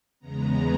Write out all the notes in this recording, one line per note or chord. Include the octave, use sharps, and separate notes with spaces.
E2 C#3 G#3 B3 A#5